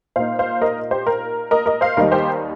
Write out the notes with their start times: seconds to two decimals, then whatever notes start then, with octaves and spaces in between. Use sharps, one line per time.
0.16 A#2 A#3 D#4 C5 F5
0.39 C5 F5
0.62 A#4 D#5
0.91 G4 C5
1.07 A#4
1.51 A#4 D#5
1.66 A#4 D#5
1.81 C5 F5
1.97 D#2 D#3 G3 D#4 A#4
2.12 G4 C5